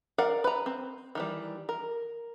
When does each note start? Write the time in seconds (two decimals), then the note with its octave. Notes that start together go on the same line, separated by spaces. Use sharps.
0.18 A#4 D5 F5 F#5
0.44 B4 A#5
0.66 C4
1.15 D#3 E3 G3
1.69 A#4